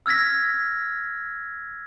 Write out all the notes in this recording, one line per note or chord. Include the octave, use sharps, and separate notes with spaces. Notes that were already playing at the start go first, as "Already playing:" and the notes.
E6 F6 G#6 A#6 B6